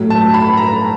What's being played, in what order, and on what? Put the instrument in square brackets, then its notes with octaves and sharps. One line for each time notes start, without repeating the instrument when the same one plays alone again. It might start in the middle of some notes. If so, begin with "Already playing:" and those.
Already playing: [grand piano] A2 F#3
A5
B5
A#5